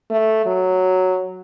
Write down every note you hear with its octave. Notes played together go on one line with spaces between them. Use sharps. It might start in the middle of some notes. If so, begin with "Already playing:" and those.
A3
F#3